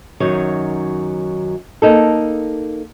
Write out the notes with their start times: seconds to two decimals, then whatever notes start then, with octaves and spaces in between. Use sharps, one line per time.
0.20 F#2 D#3 F#3 D#4 C#5
1.82 A#3 D#4 A4